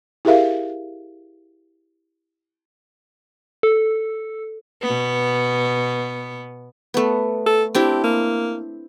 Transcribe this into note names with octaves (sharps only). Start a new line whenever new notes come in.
E4 G4 G#4 A#4 E5 F5
A4
B2 B3
A3 B3
A4
C4 D4 E4 G4
A#3